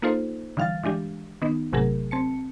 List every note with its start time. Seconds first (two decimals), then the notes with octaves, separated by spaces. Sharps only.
0.02 A#3 D#4 F4 A4 C5
0.57 D3 E3 G3 F5 F6 A6
0.83 E3 G#3 D4 G4
1.42 D#3 B3 D#4
1.73 G#1 C3 F#3 A3 G#4 A#4
2.11 C4 A5 C#7